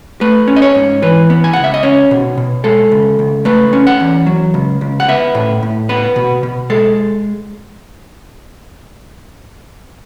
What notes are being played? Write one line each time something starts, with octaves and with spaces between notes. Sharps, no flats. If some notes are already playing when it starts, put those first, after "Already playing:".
A3 B4
C#4
D#5
C#5
G#2
E3 B4
B3
G#5
C#2 F#5
E5
D#5
C#4 C#5
B2
B2
G#3 A4
C#2
C#2
A3 B4
C#4
F#5
E2
F#3
C#2
C#2
F#5
B3 E5
A2
A2
B3 B4
B2
B2
G#3 A4